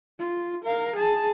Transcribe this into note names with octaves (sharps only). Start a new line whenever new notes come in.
F4
A#4 F5
G#4 A5